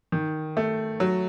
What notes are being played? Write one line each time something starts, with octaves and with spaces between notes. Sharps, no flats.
D#3
A3
F#3